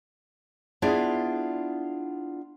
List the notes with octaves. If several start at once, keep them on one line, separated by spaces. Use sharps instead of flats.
B3 D4 E4 F4 G#4 D5